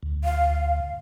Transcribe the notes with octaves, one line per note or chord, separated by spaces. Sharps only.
D2
F5